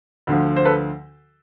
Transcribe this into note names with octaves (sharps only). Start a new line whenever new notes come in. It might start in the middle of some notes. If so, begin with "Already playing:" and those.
D2 D3 F3
C5
A4 B4